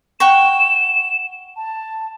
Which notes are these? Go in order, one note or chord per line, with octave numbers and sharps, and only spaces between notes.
F#5 G5 C#6 E7
A5